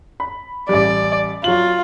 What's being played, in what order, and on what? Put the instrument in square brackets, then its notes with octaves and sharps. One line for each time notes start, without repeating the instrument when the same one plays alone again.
[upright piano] B5
[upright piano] A1 G3 [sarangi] D5
[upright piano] F#3 F#7 [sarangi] F4